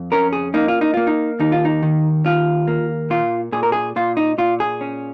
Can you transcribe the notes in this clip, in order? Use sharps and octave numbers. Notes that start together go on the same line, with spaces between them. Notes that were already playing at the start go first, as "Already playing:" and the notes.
Already playing: F2
C#4 A#4
G#4
A#3 D#4
F4
D#4
A#3 F4
D#4
D#2 D#4
F4
D#4
D#3
D#2 F4
A#3
A#2 F4
A#2 G#4
A#4
G#4
A#2 F4
D#4
A#2 F4
G#4
C#4